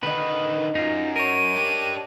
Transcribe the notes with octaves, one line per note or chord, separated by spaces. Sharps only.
D3 D#3 B4 D#5 F5
F#2 D#4 F4
A#4 C#5 D#7
D4 G4